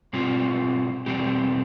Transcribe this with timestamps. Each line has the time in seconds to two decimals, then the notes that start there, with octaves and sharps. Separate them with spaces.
0.13 B2 G3 C4 F4
1.06 E2 B2 G3 C4 G4